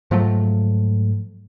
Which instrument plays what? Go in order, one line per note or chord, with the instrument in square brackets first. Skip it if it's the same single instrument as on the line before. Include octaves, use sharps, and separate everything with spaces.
[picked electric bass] G#2 F3 F#3 A3